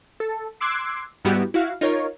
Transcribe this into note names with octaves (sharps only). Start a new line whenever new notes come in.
A4
C6 D6 E6 F#6 G#6 C7
G#2 G3 B3 E4 F#4 G4
E4 F#4 F5
D#4 F4 A#4 C#5